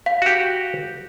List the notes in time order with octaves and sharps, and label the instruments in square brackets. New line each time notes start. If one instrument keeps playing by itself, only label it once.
[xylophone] F5
[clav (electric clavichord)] F#4 G4